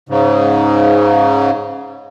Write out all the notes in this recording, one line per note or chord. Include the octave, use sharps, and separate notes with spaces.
G#2 C#3